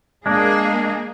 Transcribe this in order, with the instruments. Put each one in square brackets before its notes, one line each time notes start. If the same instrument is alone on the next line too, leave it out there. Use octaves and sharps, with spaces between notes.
[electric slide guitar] G#3 D4 [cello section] A#3 G#4